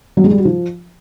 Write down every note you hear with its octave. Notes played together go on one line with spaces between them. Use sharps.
F#3
G#3
G3
F#4
F3